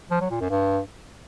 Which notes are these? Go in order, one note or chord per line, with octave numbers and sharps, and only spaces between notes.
F3
F#3
A#2
F#2
G2